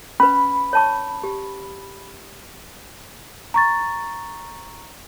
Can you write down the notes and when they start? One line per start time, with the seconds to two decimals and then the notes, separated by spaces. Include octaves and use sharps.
0.20 C#4 B4 B5
0.73 C#5 A5 C#6
1.24 G4
3.54 A#5 C#6 A6